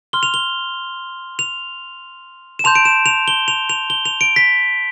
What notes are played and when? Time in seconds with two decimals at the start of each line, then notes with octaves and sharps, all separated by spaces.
0.13 C6 F6 G7
0.23 F7
0.34 G7
1.39 F7
2.59 E7
2.64 A5 C6 G6 F7
2.75 D7
2.85 E7
3.06 F7
3.28 G7
3.48 F7
3.70 F7
3.90 G7
4.05 F7
4.21 D7
4.36 B6